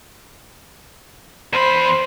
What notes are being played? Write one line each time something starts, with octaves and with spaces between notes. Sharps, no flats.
E2 C5 B5